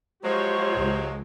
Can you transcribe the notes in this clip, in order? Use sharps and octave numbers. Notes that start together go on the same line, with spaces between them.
F3 F#3 G#3 F4 G4 C5 C#5
C#2